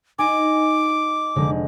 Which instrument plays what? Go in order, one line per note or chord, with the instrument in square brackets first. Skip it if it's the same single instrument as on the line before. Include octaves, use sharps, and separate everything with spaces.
[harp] D#4 G#5 [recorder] D6
[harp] F1 D3 G#3